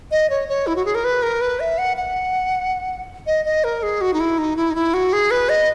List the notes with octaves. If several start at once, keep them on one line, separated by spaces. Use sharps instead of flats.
D#5
C#5
C#5
E4
F#4
G#4
A#4
B4
A#4
B4
E5
F#5
F#5
D#5
D#5
A#4
G#4
F#4
D#4
E4
D#4
E4
D#4
E4
F#4
G#4
B4
D#5